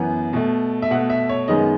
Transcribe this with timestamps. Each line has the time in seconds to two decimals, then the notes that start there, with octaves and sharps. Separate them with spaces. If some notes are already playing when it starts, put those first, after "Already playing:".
Already playing: F#2 E3 B3
0.33 B2 A3
0.82 E5
0.91 B2 A3 F#5
1.10 E5
1.29 C#5
1.48 F#2 D#3 G#3 B3 D#5